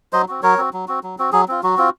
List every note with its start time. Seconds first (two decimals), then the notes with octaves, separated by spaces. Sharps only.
0.13 F#3 C5 D#5
0.28 C4 F#4
0.43 F#3 A#4 C#5
0.58 C4 F#4
0.73 F#3
0.88 C4 F#4
1.03 F#3
1.19 C4 F#4
1.32 F#3 G#4
1.48 C4 F4
1.63 F#3 F#4
1.77 C4 F4